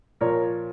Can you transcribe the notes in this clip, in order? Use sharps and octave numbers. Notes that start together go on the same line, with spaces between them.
A#2 F3 A#4 C#5